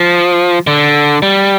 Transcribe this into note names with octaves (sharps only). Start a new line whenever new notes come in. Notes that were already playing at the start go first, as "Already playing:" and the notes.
Already playing: F3
D3
G3